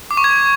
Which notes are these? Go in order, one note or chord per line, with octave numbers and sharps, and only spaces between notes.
D6
C#6
G#6